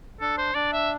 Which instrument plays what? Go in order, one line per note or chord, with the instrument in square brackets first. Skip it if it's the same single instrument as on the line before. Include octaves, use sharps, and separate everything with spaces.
[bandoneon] D4 [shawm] A4
[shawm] C5
[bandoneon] D4 [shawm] D5
[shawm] E5